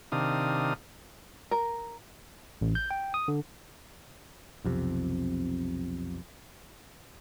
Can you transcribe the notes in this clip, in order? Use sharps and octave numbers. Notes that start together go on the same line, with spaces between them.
C3 D#3 D4 F5 D#6
A#4
A1
G6
G5
D#6
D3
B1 F2 C3